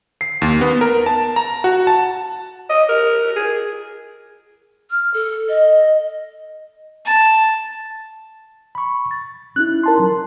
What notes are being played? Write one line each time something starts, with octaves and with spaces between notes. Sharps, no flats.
C7
D#2
B3
A#4
A5
A#5
F#4
A5
D#5
A#4
G#4
F6
A4
D#5
A5
B5 C#6
A6
C#4 D#4 E4 F#6
A#4 A5 C6
F#3